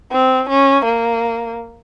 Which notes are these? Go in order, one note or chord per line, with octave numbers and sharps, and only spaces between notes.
C4
C#4
A#3